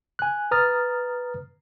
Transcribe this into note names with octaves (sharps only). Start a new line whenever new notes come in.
G#5 F#6
B4 A#5 D#6 F6 A6